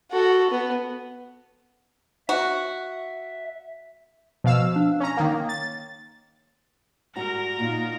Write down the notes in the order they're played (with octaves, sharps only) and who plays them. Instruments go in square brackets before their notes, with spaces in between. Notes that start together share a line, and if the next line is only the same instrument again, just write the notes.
[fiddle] F#4 A4
B3
[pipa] F#4 [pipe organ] E5
[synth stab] B2 F5 E6 [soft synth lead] F3
[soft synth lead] D4
[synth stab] C#4 A#5 [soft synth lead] C#5
[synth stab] D#3 A#3
A6
[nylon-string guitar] G#2 G3 F#4 [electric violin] A#4 A#5
[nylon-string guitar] A#2 [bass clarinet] A#3 [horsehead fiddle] D#4 F4